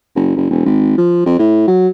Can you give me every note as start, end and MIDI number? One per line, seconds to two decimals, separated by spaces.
0.15 0.34 30
0.36 0.49 30
0.50 0.63 28
0.65 0.96 32
0.98 1.23 53
1.26 1.37 41
1.39 1.65 45
1.67 1.88 54